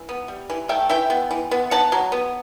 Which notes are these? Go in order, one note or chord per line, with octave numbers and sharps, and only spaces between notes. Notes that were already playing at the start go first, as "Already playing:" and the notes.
Already playing: E3
B3
G3
E3
A3 E5 G5
E3 E5 G5
B3
E3
B3
B3 F#5 A5
F#3
B3